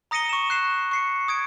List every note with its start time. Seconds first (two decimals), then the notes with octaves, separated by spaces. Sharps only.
0.11 A#5 D#6 A#6 C#7 D#7 G7
0.29 C#6 E7
0.50 F#6 C7 E7
0.91 C#6 C7 C#7
1.28 D#6 G#6 D7